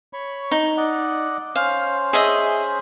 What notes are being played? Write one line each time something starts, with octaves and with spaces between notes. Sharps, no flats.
C#5 B5 C#6
D#4
D5 D#5 F#5
C#4 C5 F5
G#4 D#5 E5